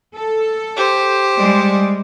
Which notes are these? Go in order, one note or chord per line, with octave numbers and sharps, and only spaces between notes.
A4
G4 C5
G3 G#3 D5